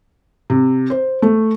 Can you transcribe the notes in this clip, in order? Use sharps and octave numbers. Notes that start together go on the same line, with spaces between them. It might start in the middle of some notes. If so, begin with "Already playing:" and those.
C3
C5
A3